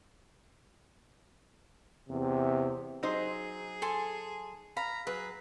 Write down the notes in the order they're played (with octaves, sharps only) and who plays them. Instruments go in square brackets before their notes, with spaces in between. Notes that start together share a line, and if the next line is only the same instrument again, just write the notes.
[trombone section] E2 C3
[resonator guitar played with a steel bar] F#3 D#4 C5 [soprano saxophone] G#4
[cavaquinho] A4 G#5 C6
[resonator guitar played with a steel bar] F5 [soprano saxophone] A#5 [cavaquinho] B5
[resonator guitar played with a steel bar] F#3 [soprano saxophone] G#4 [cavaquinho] B4